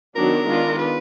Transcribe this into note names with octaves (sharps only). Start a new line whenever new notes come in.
D#3 F#3 B3 D4 A#4
D#3 G#3 B3 D4 F4
B4